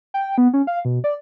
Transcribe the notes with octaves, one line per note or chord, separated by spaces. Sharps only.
G5
B3
C#4
F5
B2
D5